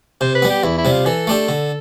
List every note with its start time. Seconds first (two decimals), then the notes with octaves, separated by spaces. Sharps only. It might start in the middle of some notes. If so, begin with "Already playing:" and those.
0.21 C3 C5
0.35 B4
0.42 G3 B3
0.50 G4
0.64 E2 E4
0.78 E4
0.85 C3 G3
0.92 F4
1.06 E3 A4
1.27 A3 D4 G4
1.49 D3